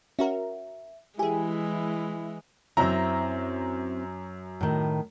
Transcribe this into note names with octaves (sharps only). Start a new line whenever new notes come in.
C#4 F#4 A#4 E5
E3 G#3 E4 G4 G#4 G#5
F#2 C4 E4 E5 A#5
A2 D#3